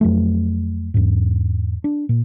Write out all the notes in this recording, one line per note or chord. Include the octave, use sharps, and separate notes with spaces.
F2 F#3 A3
E2 G#2
D4
A#2